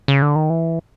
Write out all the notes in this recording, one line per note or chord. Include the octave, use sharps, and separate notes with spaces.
C#3
D3
D#3
E3